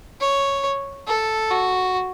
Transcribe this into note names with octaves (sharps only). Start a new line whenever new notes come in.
C#5
A4
F#4